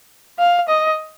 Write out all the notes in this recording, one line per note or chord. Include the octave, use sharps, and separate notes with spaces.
F5
D#5